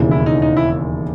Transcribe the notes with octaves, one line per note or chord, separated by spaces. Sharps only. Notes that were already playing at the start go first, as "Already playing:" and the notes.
Already playing: E1 D#2 C#3 E3
E4
D#4
D#4
E4